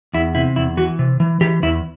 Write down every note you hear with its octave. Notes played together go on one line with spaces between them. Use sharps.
E2 E4
C3 E4
E2 E4
E3 F#4
C3
E3
E3 G4
E2 E4